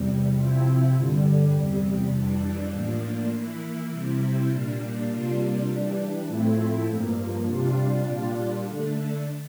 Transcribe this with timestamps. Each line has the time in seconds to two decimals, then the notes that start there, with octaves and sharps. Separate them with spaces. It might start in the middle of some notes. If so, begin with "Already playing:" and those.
Already playing: E2 C3 G3
0.35 C3 F3 C4 E4
0.94 G2 D3 G3
1.53 E2 C3 G3
2.12 F2 E3 G3 D4
2.72 A2 F3 A#3 D4
3.31 E3 A#3 E4
3.90 C3 G3 C4 E4
4.50 A#2 G3 A#3 D4
5.09 C3 G3 A#3 D4 F4
5.68 E3 G3 D4
6.27 A2 F3 A3 C4 E4
6.87 G2 F3 A#3
7.46 C3 G3 D4 F4
8.06 A#2 G3 D4 F4
8.64 D3 A3 D4